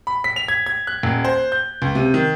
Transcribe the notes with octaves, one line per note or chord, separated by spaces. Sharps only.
B5
B6
F7
G#6
G#6
F#6
D#1
C5
G6
C#2
C3
D#3